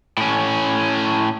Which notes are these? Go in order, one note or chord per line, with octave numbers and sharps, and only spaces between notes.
A2 C#4